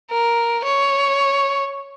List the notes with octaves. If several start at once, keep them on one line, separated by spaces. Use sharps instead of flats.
A#4
C#5